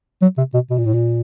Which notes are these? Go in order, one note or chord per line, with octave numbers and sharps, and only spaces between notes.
F#3
C3
B2
B2
A#2
A2
A#2